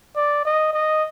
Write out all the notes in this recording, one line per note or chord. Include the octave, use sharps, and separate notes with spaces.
D5
D#5
D#5